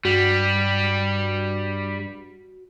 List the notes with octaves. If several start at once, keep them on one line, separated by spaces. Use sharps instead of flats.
G2 G3 F#4